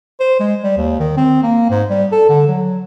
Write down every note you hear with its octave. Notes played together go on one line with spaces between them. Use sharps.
C5
G#3
G3
D#2
D#3
C4
A#3
G#2
G3
A4
D3
F#3